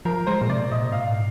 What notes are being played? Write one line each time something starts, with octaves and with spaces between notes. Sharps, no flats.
F3 A#4
G#3 C5
A#2
C3 D5
A#2 D#5
G#2 F5